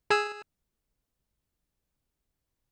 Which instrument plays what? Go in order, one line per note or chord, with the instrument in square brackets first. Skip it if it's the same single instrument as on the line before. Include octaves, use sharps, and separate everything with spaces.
[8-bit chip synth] G#4 G#5 E6